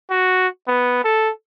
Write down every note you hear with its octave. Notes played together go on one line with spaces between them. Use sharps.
F#4
B3
A4